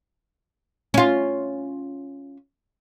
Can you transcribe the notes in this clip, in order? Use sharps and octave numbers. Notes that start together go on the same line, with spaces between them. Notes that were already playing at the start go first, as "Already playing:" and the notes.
C#4 F4